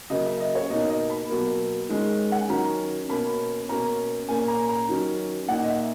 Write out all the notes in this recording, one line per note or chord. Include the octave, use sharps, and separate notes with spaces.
C#3 F#3 A#3 D#5
E5
D#5
C#5
B2 A#3 D#4 D#5
D#5
B5
B2 F#3 A#3
D#3 G#3 C#4
F#5
G#5
D#3 F#3 C#4 A#5
B2 A#3 C#4 B5
B2 A#3 C#4 A#5
A#2 A#3 C#4 G#5
A#5
A#5
D#3 F#3 C#4
A#2 A#3 D#4 F#5
D#5
E5